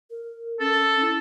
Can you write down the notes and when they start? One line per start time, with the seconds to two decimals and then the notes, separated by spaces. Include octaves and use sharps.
0.10 A#4
0.60 C#4 A4
1.01 E4